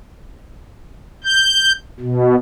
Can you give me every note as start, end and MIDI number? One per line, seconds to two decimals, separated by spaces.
1.24 1.72 91
2.00 2.35 47